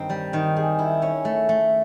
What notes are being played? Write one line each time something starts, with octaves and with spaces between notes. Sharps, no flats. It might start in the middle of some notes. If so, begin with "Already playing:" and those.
Already playing: G2 D#3 C4 D#4
G3
D#3
G#4
E4
C#4
A3
A3